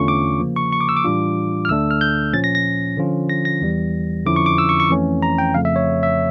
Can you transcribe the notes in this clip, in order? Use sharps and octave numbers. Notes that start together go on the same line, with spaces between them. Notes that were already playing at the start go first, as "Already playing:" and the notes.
Already playing: E2 D3 A3 C#4 F4 C#6
D6
C#3 F3 A#3
C#6
C#6
D6
E6
D6
A2 E3 G3 D4 F4
F6
D2 D3 A3 D4 E6
F6
G6
A#2 F3 C#4 A6
A#6
A#6
D3 F3 C#4 F4
A#6
A#6
E2 E3 G3
F2 D3 F3 C#4 E4 D6
C#6
D6
E6
C#6
C#6
F2 E3 A3 C#4
A#5
G5
F2 C#3 F3 A3 F5
E5
C#5
E5